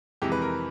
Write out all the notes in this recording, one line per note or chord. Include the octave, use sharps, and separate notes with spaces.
F2 C3 E3 G#3 G4
B4
A#4